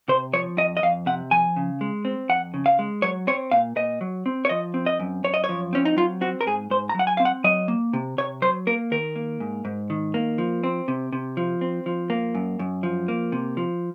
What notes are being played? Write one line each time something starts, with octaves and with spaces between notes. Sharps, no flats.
C3 C5
F3 C#5
F2 D#5
D#5
F2 F5
C3 F#5
F3 G#5
C#3
G#3
C4
F2 F#5
C#3
F5
G#3
F#3 C#5
C4 C#5
A#2 F5
A#2 D#5
F#3
C4
C#5
F3 D#5
C4
D#5
F#2
F#2 C#5
D#5
F3 C#5
C4 C#4
D#4
F#3 F4
C4 F#4
A#4
G#2 G#4
G#2 C5
A#5
F#3 F#5
G#5
C4 F5
F#5
F#3 D#5
A#3
C3
C3 C#5
F#3 C5
A#3 A#4
D#3 A#4
A#3
G#2
G#2
D#3
A#3
F3
C4
C3
C3
F3
C4
F3
A#3
F#2
F#2
F3
A#3
C3
F3